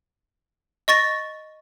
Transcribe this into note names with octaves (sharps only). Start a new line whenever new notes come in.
D#5 C#6 A6 A#6